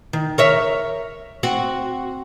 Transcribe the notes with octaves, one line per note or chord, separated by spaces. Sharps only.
D#3
A#4 C#5 E5
C4 F#4